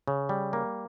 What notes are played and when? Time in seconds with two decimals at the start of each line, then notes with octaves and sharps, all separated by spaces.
0.08 C#3
0.29 G3
0.53 A#3